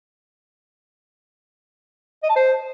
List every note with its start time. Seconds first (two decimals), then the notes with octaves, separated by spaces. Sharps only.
2.23 D#5
2.29 A5
2.36 C5